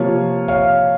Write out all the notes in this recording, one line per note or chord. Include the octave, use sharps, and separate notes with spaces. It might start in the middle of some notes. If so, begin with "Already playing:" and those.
Already playing: C3 F3 A#3 F4 C#5 F5
C#5 F5